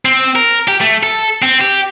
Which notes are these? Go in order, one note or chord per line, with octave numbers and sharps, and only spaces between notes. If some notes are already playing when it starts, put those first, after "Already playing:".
C4
A#4
G4
A3
A4
C4
G4